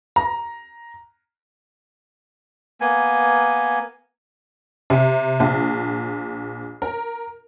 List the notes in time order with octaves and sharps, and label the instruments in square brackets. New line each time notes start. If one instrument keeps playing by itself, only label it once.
[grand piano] A#5
[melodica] A#3 B3 G#5
[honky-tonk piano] C3
A#1
A#4